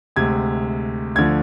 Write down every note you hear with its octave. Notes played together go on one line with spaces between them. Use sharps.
D2 C3 G#3 G#6
D2 D3 F3 G#6